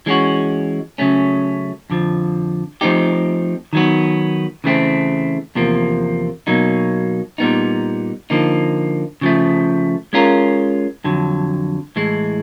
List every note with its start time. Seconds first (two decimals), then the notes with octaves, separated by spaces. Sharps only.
0.06 E3 G#3 C#4 F#4
0.98 C#3 F#3 A3 C#4
1.90 F2 D3 F3
2.81 F3 A3 C4 D#4 G4
3.73 D#3 F#3 B3
4.64 C#3 E3 A3 C4
5.55 E2 C3 F3 A#3
6.47 B2 F#3 A#3 D#4
7.38 A#2 G3 B3 D#4
8.30 D3 F3 A#3 D#4
9.21 C#3 F3 A3
10.13 G#3 C#4 F4 A#4
11.04 F2 D3 F#3
11.96 A2 E3 G#3